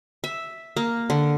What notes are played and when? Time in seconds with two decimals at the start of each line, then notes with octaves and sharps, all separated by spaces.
0.24 E5
0.77 A#3
1.10 D3